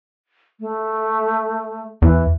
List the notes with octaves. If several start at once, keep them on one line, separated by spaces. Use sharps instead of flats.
A3
E2 E3